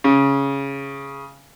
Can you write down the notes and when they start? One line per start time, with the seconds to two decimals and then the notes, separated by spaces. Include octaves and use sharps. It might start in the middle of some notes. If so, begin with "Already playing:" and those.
0.04 C#3